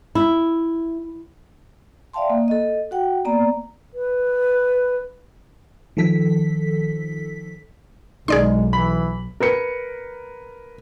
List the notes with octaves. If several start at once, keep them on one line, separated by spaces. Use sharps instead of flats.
E4
D5 E5 F5 G5 A5 C6
A#3
A4 D#5
F#4 F#5 G5
A#3 B3 D5 A#5
B4
D#3 F3 A4 B6
B1 D#3 G#3 G#4 D5 C6
E3 B5
A#4 B4 C#7